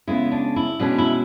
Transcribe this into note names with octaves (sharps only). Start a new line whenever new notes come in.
C#3 G#3 B3 E4
D4
E4
B2 G#3 C#4 D4
E4